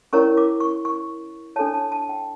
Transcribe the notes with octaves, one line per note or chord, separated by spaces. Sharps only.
C#4 E4 A#4 C#5 C#6
D6
C#6
C#6
D4 A4 C#5 A5
A5
A5
G5